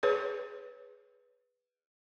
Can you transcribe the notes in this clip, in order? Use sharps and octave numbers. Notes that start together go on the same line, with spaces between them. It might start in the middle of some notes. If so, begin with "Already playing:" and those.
G#4 B4 C#5